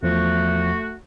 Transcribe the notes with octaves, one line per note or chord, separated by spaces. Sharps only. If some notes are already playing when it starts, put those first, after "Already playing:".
E2 F3 A3 F#4